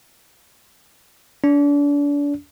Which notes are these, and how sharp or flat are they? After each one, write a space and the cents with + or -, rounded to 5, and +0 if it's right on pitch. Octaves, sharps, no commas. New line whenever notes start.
D4 -35